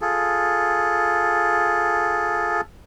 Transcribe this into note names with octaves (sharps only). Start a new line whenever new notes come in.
F4 G#4 A4